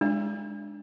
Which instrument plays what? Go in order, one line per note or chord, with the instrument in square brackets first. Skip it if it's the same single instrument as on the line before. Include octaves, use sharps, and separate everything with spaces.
[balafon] G#3 [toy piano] D4